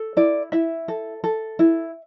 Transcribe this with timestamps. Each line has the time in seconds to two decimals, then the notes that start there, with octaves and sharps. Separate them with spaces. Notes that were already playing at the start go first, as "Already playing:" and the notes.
Already playing: A4
0.17 E4 D5
0.52 E4 E5
0.88 A4
1.24 A4
1.59 E4